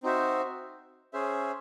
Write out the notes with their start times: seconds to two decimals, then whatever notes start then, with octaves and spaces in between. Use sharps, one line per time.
0.03 C4 D#4 F#4 C5 E5
1.13 C#4 G#4 C5 E5